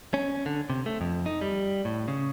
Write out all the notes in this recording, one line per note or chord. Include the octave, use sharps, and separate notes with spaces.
C#4
D3
C3
A3
F2
D#4
G3
A2
C#3